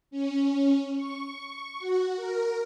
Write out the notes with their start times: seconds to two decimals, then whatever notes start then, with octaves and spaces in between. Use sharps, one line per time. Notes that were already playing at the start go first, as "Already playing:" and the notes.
0.11 C#4
0.95 C#6
1.79 F#4
2.16 A#4